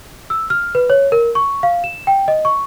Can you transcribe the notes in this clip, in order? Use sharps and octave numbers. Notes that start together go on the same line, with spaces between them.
E6
F6
B4
C#5
A#4
C#6
F5
E7
G5
D#5
C#6